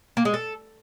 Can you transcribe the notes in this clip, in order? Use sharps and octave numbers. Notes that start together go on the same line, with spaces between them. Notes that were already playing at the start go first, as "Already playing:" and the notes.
A#3
G#3
A4